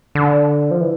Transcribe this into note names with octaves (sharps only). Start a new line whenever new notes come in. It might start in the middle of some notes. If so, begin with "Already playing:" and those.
D3
F3
E3